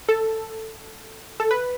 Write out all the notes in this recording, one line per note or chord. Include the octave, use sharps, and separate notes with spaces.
A4
A4
B4